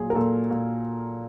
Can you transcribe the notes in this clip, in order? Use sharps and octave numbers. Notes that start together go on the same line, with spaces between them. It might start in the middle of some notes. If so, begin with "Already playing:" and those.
Already playing: A#2 F#3 G#4
A#4
A#2 A4
A#2